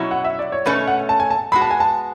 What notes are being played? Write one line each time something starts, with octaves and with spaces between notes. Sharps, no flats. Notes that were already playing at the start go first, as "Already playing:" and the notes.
Already playing: B2 F#3 C#4 E4
F#5
E5
D5
C#5
B2 A3 C#4 B4
F#5
A5
G#5
A5
G#3 B3 F#4 B5
A5
G#5
A5